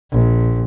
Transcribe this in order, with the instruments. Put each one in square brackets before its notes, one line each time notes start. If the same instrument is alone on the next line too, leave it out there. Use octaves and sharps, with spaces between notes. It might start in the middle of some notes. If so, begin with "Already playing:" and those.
[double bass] A#1